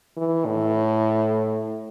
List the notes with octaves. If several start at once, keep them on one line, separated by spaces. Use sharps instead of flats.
E3
A2